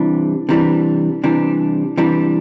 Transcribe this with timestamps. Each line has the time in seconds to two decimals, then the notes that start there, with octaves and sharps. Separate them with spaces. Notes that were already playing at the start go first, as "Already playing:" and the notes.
Already playing: C3 E3 G3 D4
0.49 C3 E3 G3 D4
1.24 C3 E3 G3 D4
1.97 C3 E3 G3 D4